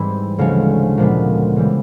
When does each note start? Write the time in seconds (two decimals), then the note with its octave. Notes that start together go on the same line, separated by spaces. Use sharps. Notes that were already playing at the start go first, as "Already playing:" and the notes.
Already playing: G#2 E3 G3 C4 E4
0.38 D2 C#3 F3 G#3 C#4
0.98 A#2 F3 G#3 B3
1.56 C#3 E3 G3